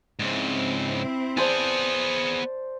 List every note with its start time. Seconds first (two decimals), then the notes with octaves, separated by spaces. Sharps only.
0.19 G#2 C#3 C4 E4
1.37 B3 G#4 C5 D5 A5